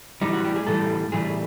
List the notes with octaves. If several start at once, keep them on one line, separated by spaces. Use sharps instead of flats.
A2 E3 G3 D#4
F#4
G4
G#4
A2 E3 G3 A4
A2 E3 G3 G#4